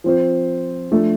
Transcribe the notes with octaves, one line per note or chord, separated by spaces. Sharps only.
F3 C4 F4 C5
F3 A3 D4 A4